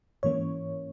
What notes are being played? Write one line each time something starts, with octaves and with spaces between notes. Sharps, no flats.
G#2 E3 A#3 C#4 C#5